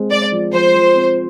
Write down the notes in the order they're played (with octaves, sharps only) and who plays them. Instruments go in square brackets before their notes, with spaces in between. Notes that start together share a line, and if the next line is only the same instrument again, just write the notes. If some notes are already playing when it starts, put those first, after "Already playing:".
Already playing: [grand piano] G#3 C4
[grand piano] G#3 [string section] D5
[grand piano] F3
[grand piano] F3 [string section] C5
[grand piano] F3
C4